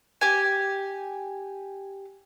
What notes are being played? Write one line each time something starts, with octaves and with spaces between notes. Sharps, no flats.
G4 G#5